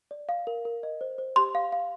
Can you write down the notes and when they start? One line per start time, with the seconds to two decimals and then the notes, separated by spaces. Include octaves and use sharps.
0.11 D5
0.29 F5
0.47 A#4
0.65 A#4
0.83 D#5
1.01 C5
1.18 C5
1.36 G4 C6
1.55 F5
1.72 F5